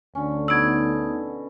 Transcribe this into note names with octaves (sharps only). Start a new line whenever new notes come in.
D2 D3 C#4
B2 B3 D#4 F#4 A4 E6 G#6